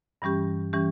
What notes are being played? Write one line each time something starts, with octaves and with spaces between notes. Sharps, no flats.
G2 E3 G3 C#4 G4
E3 G3 C#4 G4